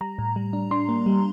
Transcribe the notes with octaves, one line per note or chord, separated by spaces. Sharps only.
G3 A#5
A2
G3
D4
D4 C6
A#3
G3